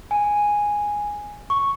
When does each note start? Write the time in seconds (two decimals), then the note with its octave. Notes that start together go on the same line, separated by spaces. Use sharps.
0.11 G#5
1.50 C#6